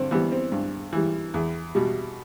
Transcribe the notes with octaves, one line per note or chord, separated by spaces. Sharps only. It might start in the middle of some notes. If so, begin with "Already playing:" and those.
Already playing: G2 D3 C4 D4
E3 G3 B3
C4
G2
E3 G3
E2
B2 G3